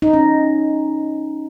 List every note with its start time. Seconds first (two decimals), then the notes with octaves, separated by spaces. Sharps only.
0.02 D#4
0.13 C#4